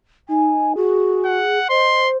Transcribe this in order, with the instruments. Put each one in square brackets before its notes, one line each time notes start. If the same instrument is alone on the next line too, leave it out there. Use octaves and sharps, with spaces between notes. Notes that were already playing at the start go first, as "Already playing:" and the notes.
[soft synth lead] D#4 [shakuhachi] G#5
[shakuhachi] F#4 [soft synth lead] G#4
[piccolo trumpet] F#5
[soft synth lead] C5 [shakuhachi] D#5 [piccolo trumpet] C6